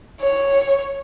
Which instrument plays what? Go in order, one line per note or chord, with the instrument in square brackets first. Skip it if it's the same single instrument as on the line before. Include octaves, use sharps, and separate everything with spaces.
[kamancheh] C#5